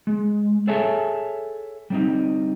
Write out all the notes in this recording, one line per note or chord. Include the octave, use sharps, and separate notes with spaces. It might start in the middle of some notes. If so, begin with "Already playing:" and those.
G#3
G#4 A4 C#5 E5 G#5 A5
G3 C4 D#4